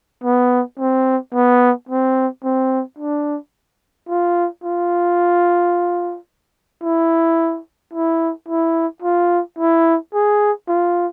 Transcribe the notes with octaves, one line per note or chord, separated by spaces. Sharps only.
B3
C4
B3
C4
C4
D4
F4
F4
E4
E4
E4
F4
E4
G#4
F4